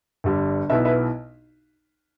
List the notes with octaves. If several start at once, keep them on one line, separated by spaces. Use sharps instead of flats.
G1 G2 D3 G3
B1 B2 B3 E4 B4 E5
B4 E5